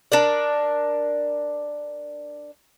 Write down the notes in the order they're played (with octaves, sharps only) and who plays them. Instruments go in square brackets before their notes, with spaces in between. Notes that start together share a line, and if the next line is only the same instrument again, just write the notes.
[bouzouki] D4 A#4 D5